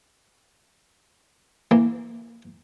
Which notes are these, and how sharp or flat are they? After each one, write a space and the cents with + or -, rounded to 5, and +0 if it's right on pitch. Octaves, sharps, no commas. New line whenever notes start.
E3 +0 A#3 +0